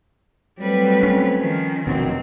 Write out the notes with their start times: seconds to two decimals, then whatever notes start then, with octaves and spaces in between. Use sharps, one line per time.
0.59 F#3 G3 A3 C4 B4
1.03 C#4
1.40 D#3 F3
1.87 F1 B2 D#3 F#3 C4